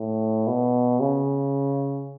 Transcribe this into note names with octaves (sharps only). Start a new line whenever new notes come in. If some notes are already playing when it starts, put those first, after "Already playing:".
Already playing: A2
B2
C#3